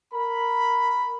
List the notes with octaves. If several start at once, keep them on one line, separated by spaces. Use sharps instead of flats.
A#4 B5